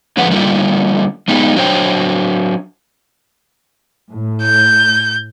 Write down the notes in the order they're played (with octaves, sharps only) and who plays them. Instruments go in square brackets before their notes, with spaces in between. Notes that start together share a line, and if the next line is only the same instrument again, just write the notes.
[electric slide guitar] A2 D3 F3 G#3 B4 F#5
D3 G3 A3 A#3 F4
G#3 B3 D#4 G4 G#4
F#3 D4 C5 G5
[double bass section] A2
[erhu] G6